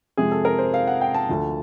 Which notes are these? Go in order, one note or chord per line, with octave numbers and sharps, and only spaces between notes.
F2 C3 F3 G#3 G#4
A4
A#4
C5
F5
F#5
G5
A5
D2 D3 F3